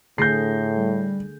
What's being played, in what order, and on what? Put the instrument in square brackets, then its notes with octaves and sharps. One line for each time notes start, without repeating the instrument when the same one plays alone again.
[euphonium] A2 [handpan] D3 A3 G#4 [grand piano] G6 A#6 C7
[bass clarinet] G3